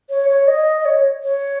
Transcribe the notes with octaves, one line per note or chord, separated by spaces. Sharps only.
C#5
C#5
D#5
C#5
C#5